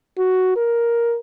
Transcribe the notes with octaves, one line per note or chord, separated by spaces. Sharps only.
F#4
A#4